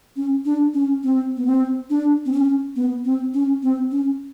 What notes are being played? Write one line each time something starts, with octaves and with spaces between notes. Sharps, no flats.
C#4
D4
C#4
C4
B3
C4
D4
C4
C#4
B3
C4
C#4
C4
C#4